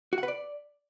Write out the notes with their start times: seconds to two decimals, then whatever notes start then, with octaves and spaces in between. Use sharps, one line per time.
0.13 F#4
0.18 F#5
0.23 B4
0.28 D5